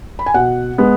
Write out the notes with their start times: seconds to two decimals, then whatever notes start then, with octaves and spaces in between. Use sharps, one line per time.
0.19 B5
0.26 G#5
0.34 B2 F#5
0.78 G#3 B3